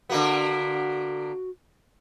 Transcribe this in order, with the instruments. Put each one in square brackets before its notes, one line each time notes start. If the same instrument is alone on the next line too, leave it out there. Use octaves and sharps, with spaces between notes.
[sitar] D3 A#3 B3 [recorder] F#4